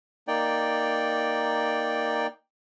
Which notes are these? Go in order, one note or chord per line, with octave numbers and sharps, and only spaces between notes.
A#3 D#4 D5 G5